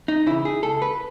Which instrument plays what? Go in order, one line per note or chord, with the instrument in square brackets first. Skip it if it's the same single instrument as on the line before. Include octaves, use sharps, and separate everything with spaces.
[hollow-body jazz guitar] D#4
C#3 E3 E4
G#4
C#2 A4
B4